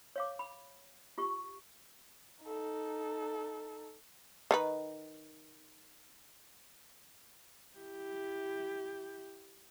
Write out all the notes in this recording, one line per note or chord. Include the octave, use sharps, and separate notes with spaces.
C#5 F5 D6
B5
F4 G4 C#6
D#4 A4
D#3 D#4 B4
E4 G4